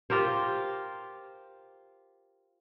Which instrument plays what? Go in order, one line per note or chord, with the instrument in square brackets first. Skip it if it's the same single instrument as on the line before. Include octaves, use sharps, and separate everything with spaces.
[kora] F4 G4 A#4 C5